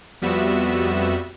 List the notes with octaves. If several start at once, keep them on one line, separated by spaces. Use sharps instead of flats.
F2 G3 B3 F#4 E5 E7